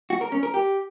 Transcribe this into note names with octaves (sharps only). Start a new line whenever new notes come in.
F#4
A#4
C#4
A#4
G4